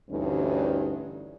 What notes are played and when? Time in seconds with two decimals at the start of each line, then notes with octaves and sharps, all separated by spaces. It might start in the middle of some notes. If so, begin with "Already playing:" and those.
0.10 D2 G2 E3 C#4 D#4